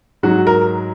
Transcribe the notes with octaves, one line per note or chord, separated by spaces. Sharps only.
G#2 F#3 F#4
A#4